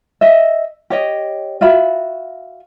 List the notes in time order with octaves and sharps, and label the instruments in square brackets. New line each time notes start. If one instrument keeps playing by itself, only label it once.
[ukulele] D#5 E5
G4 C#5 D#5
F4 F#4 E5 B5